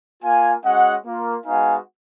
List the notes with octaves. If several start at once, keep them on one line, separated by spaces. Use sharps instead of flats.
A#3 F4 F5 G#5
G#3 C#4 F#4 D#5 F#5
A#3 F4
G#3 B3 D#4 F#4 F5 G#5